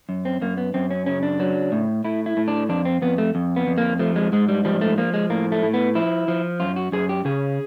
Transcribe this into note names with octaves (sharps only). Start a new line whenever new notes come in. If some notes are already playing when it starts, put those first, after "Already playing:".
F#2
C4
F#2 A#3
B3
F#2 C4
C#4
C#3 C#4
D4
F#3
A2
A2 E4
E4
A2
D4
F2 D4
C4
F2 B3
A3
F2
B3
F2
A#3
F3 A3
G#3
G#2 G#3
G3
F3 G3
A3
F3 A#3
G#3
A2 A#3
A3
A2
B3
F3 E4
F3
F#2 F4
F#4
F#2 G#4
G4
C#3 G#4